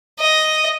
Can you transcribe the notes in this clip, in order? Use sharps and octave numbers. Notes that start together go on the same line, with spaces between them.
D#5